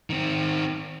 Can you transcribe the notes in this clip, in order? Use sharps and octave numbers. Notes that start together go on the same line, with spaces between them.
D#3 C4